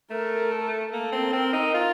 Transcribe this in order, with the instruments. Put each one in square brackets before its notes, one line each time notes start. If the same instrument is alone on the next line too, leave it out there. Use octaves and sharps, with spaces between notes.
[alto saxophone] A3 [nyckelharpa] A#4
[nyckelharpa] A4
[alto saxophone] A#3 [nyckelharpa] A4
[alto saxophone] C4
[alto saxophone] C4 [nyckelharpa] A#4
[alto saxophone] D#4
F4